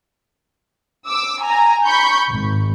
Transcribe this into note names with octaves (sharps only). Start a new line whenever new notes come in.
D6 E6
G#5 A#5
B5 C#6 G6
G#1